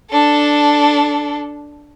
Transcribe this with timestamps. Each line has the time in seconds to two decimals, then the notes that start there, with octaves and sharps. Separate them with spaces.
0.11 D4 A4